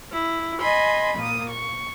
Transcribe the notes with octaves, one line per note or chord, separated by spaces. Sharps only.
E4
D#5 G#5 B5 C6
A#2 A#3 D#6
C#6